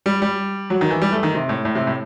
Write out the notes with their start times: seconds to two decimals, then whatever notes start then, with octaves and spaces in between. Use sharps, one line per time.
0.06 G3
0.22 G3
0.70 F#3
0.81 D#3
0.90 E3
1.02 G3
1.12 A3
1.23 D#3
1.34 C3
1.49 A2
1.65 A2
1.75 C3
1.87 A2